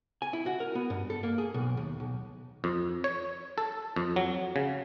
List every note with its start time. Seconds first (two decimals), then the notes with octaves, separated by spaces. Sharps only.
0.22 G#5
0.33 E4
0.46 F#4
0.60 A#4
0.75 B3
0.90 G2
1.10 A4
1.23 A#3
1.38 G#4
1.54 B1
1.77 D#2
2.00 B1
2.64 F2
3.04 C#5
3.58 A4
3.96 F2
4.16 F#3
4.56 C#3